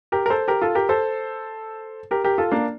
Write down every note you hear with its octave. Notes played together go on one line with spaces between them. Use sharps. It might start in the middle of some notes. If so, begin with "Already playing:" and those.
G4 A#4
A#4
A4 C5
G4 A#4
F4 A4
G4 A#4
A4 C5
G4 A#4
G4 A#4
F4 A4
A#3 D4